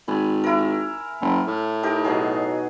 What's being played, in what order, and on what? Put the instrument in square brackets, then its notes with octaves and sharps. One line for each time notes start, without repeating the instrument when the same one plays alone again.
[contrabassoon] G#1 [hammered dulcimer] G#5 B5
[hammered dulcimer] E4 A#4
[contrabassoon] F#1
A2
[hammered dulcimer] D#4 G4 A#4
B2 F#3 G#4